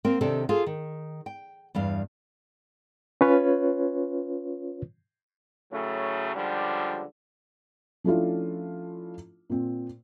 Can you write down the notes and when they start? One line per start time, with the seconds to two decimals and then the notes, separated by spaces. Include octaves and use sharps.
0.05 A#3 C4 A#4 G5
0.21 C3 D#3 D4 G4 A4
0.49 F4 G#4 A4 F5
0.66 D#3
1.26 G5
1.75 E2 G2 F5
3.21 C#4 F4 B4 C#5
5.72 A2 C#3 F#3 A3
6.36 C#2 D3 F3 G3
8.04 F3 A3 C#4 D4 E4 F4
9.50 A#2 C4